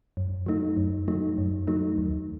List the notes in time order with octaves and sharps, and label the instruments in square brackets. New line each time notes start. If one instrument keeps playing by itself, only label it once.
[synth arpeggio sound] F#2
F#3 A3 D#4
F#2
F#3 A3 D#4
F#2
F#3 A3 D#4
D#2